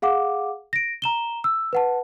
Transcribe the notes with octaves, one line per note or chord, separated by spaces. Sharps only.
G#4 F5 F#5 D6
A#6 D7
A#5 E7 G7
E6
B4 F#5 A5